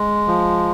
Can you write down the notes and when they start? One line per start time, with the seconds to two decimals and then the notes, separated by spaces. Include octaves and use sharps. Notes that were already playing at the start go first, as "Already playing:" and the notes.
Already playing: G#3
0.28 F3